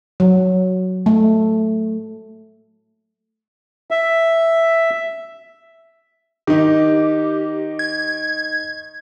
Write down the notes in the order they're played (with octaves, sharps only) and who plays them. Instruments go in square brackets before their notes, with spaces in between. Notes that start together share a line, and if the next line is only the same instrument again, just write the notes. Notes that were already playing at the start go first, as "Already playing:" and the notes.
[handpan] F#3
A3
[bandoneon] E5
[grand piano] D#3 D#4 [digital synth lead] G4
[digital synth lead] G#6